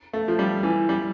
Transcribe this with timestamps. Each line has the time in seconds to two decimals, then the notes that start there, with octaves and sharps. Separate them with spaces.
0.13 A3
0.28 F3
0.39 G3
0.63 E3
0.89 G3